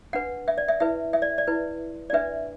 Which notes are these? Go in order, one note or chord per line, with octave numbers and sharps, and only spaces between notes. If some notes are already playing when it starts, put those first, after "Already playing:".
D4 B4 F#5
E5
D5
E5
E4 B4 E5
E5
D5
D5
E4 B4
D5
D4 B4 E5